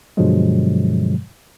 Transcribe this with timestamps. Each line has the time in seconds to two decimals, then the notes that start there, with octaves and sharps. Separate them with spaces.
0.17 G2 B2 D3 F3 F#3 G#3